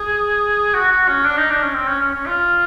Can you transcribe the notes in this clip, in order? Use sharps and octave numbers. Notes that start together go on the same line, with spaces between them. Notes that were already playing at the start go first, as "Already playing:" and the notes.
Already playing: G#4
F#4
F#4
C#4
D4
D#4
D4
C#4
C4
C#4
C#4
C#4
F4